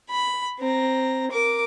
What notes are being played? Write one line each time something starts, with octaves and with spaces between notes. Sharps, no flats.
B5
C4 A#5
A#4 D6